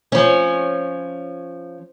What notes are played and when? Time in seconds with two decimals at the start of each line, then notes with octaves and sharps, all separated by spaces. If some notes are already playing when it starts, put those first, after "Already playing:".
0.12 F3 C#4